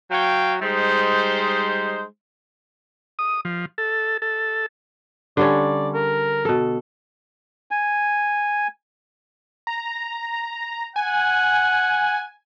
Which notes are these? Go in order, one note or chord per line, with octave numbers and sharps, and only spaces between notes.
F#3 C#5 F5 G5
G3 G#3 D#4 C5
D#6
F3
A4
A4
D3 G3 C#4 D5
A#4
B2 A4
G#5
A#5
F#5 G#5